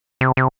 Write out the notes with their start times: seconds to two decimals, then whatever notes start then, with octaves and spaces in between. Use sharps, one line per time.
0.21 C3
0.37 C3